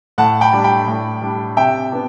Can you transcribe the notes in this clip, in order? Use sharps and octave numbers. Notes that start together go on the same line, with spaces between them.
A2 F#5 A5
G5 B5
G3 D4
G5 B5
A2
G3 D4
C3 E5 G5
B3 D4